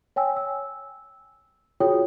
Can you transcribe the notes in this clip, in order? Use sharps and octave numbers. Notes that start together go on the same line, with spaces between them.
C#5 G5 G#5 E6
E6
F4 F#4 G#4 C#5 G5 D#6